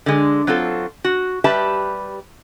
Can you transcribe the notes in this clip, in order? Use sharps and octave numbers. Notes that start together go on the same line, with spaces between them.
D3 G#3
F#3 C4 F4 A4
F#4
G3 G4 B4 E5 A5